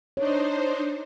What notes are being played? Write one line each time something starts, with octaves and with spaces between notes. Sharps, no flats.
D4 D#4 C5 C#5